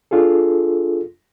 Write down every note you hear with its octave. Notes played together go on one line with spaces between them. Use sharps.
D4 F4 G#4 A4